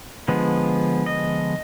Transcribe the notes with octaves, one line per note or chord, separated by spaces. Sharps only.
D3 F3 G#3 B3
D#5